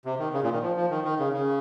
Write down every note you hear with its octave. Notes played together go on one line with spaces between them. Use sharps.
C3
D#3
C#3
A#2
D#3
F3
F3
D#3
D#3
C#3
C#3